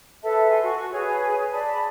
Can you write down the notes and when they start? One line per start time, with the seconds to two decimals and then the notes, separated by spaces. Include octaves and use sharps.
0.24 A4 B4 E5 A5
0.50 A4 G#5 C6
0.64 F#4 C#6
0.93 G#4 B4 C#5 G#5
1.53 D5 A5 B5